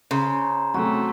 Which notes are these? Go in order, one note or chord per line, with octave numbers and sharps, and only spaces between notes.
C#3 C5 A#5
C3 F#3 A3 F#4